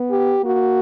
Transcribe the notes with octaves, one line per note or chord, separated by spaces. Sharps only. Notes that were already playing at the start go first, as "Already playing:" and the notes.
Already playing: B3
G4
A#3 F#4